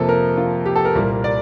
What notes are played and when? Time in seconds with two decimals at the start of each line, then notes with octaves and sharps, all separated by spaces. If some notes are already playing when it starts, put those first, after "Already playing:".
Already playing: F2 C3 F3 A#3 A4
0.09 A#4
0.37 F4
0.66 G4
0.76 A4
0.85 A#4
0.95 C2 A#2 G3 A#3
1.24 D5